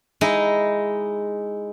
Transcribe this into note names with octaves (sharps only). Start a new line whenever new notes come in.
G#3 D#4 E4